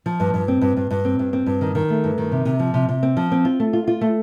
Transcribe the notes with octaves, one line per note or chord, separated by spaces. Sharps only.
F3
G2
G2
C4
G2
G2
G2
C4
G2
C4
G2
D#3
D#3
A3
G2
D#3
C3
C3
F3
C3
C3
C4
F3
C4
F4
A3
F4
F4
A3